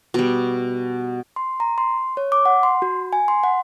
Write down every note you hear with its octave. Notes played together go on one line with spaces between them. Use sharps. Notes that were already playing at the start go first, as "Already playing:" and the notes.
B2 G3
C6
A#5
C6
C#5
D6
F#5
C6
F#4
G#5
C6
F#5